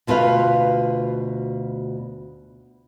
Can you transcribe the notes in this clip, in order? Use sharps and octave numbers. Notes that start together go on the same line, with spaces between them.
D2 B2 F4 A4 B4 F5